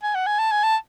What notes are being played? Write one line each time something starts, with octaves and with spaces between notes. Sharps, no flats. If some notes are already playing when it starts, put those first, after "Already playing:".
G#5
F#5
G#5
A5
G#5
A5